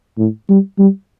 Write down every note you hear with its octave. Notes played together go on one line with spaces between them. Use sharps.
A2
G3
G3